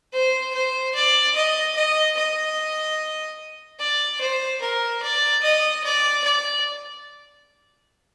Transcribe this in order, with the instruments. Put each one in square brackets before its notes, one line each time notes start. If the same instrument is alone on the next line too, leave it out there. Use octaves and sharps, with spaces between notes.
[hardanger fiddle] C5
C5
D5
D#5
D#5
D#5
D5
C5
A#4
D5
D#5
D5
D5